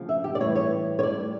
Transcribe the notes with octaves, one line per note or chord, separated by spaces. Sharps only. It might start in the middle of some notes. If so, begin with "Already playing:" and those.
Already playing: D2 C#3 F3
E5
G4
D5
A2 E3 G3 C#5
C#5
C#5
A2 G3 D5